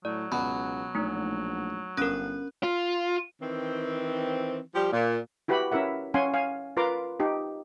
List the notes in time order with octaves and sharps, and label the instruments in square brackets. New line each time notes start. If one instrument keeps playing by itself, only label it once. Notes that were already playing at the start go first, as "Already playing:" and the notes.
[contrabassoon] A2 [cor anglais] F#3 [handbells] D5
[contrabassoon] C#2 [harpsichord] B2 [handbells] B5
[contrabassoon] A#1 [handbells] A3 D#4
[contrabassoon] G1 [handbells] C#4 A#4 [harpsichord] B4
[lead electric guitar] F4
[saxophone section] D#3 E3 C4
F3 G3 G4
A#2
[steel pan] E4 F#4 G4 B4 F#5 B5
C#4 E4 A#4 E5 F#5
C#4 F5 F#5 G#5 C6
F5 G#5
F4 A#4 B4 A#5 C6 D6
D#4 G4